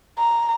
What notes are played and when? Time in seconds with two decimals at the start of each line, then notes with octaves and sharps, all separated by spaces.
0.18 A#5